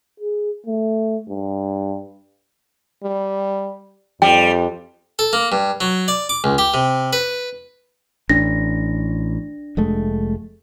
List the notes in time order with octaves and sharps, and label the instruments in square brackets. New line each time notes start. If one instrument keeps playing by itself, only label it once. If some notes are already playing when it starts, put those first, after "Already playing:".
[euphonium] G#4
A3
G2
[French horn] G3
[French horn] F2 [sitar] G3 [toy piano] G5
[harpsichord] A4
A#3
G2
F#3
D5
D6
C#2
G4
C3
B4
[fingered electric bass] A1 [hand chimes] D4 A#6
[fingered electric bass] F1 G#3 A3